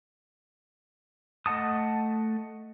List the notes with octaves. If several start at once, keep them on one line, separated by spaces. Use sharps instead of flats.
A3 D#5 F#5 A5 D#6